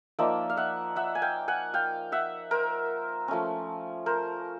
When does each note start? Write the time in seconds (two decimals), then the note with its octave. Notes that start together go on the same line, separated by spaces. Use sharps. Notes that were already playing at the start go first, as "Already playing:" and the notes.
0.19 F3 A#3 D#4 D5 E5
0.50 F5
0.57 E5 F#5
0.96 E5 F#5
1.15 G#5
1.22 F5 G5
1.48 F#5 G#5
1.74 F5 G5
2.12 E5 F#5
2.51 A#4 C5
3.28 F3 A3 C#4
4.06 A#4 C5